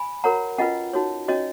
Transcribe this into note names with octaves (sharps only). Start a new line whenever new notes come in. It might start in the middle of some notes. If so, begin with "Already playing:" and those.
Already playing: G#5 B5
F#4 A#4 C#5 F#5 A#5
C#4 F4 B4 D#5 F#5
D#4 F#4 C#5
C#4 F#4 C#5 D#5